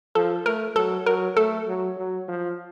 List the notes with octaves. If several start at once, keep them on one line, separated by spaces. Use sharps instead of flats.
F3 A4
A3 A#4
F#3 A4
F#3 A#4
A3 A4
F#3
F#3
F3